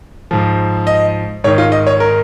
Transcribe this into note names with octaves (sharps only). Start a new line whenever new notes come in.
G#2 F3
D#5
G#2 D#3 C#5
F4
D#5
C#5
A#4